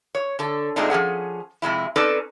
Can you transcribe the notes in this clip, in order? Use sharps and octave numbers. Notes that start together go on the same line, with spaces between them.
C#5
D3 A4
A#2 G#3 A3 C4 D4 D#4
F3 C#4 G#4 F#5
F2 C3 G#3 E4
C4 C#4 D#4 A4 B4 D5